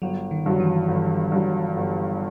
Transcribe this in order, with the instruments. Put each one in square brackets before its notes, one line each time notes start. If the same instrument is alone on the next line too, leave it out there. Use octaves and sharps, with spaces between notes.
[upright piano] G1 [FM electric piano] F#3
[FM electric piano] D#3
[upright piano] G2 F#3
[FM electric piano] E3
[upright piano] G1
G2 F#3
G1